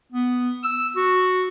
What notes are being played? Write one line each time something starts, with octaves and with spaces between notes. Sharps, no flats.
B3
E6
F#4